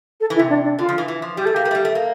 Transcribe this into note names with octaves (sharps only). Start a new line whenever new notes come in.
A4
E3
E4
C3
D4
D4
D3 F4
F3
E3
E3
F3
G3 G4
A3 A4
A#3 G4
A#3
A3
G3
A3
A#3